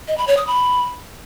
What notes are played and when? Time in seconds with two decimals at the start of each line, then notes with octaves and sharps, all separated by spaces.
0.08 D#5
0.18 B5
0.27 C#5
0.37 D#6
0.47 B5